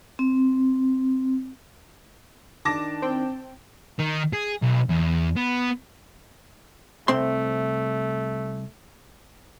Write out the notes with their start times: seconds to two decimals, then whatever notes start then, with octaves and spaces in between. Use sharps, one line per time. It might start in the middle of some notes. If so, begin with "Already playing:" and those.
0.19 C4
2.65 D#3 D4 A5 D6 A#6
3.02 C4 G5
3.99 D#3
4.33 G#4
4.63 B1
4.90 E2
5.37 B3
7.08 C2 A3 C4 C6